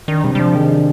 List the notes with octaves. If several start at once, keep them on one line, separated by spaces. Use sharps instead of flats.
D#3 D4
C3 G3
G3
F3 D4
D#3 G#4
D4